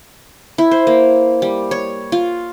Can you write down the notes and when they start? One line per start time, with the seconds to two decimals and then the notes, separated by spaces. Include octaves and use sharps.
0.58 E4
0.71 C5
0.87 A#3
1.42 G3
1.71 C#5
2.12 F4